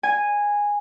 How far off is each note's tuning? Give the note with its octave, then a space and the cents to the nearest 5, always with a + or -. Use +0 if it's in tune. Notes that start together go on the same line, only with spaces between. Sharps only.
G#5 -10